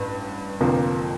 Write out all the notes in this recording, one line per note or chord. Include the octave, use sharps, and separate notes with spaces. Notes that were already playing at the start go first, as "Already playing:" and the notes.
Already playing: A1 G2
F1 F2 D3 F3 A#3